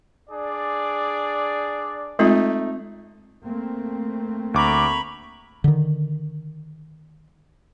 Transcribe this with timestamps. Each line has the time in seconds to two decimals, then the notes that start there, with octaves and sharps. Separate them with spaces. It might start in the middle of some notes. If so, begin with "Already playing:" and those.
0.30 D4 G#4 D5
2.19 G#3 A3 C4 D#4 F4
3.44 A3 A#3 C4
4.54 D2 A#5 B5 C#6 D6
5.64 D3 D#3